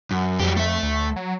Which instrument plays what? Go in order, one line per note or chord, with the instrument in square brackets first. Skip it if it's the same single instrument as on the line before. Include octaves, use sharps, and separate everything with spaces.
[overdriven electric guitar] F#2
[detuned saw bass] F2 [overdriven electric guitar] F#3 G4
[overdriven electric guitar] A3 E5
[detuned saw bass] D2
F#3